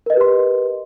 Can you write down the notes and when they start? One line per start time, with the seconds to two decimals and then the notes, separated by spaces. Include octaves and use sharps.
0.06 A#4
0.10 D#5
0.14 B4
0.17 G4
0.21 C6